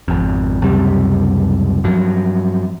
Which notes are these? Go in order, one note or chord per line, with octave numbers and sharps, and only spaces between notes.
G#1 F2
C#2 F#2 C3 G3
G2 F3 F#3